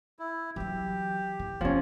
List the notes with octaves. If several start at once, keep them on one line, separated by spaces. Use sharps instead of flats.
E4
E3 F#3 G4
E3
F1 F3 A3 C#4